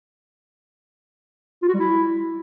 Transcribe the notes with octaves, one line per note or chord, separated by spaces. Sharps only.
F4
F#4
G3
E4